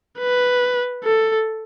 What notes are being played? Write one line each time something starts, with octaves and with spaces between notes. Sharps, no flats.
B4
A4